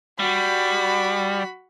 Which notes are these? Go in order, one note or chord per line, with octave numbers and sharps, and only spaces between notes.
G3 F#4 B5